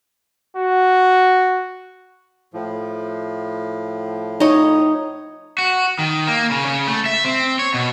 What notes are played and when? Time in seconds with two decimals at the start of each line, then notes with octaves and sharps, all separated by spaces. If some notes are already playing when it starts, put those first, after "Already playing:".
0.57 F#4
2.54 A2 F3
4.40 D#4 C#5
5.58 F#4
5.99 D#3
6.27 A#3
6.51 C#3
6.66 C#3
6.88 A3
7.06 E5
7.24 C4
7.59 C#5
7.74 B2